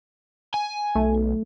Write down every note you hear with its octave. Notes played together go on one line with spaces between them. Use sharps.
G#5
B1 A3